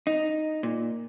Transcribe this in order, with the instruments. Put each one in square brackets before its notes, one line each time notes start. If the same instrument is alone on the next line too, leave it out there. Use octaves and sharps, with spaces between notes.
[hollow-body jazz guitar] D#4
A#2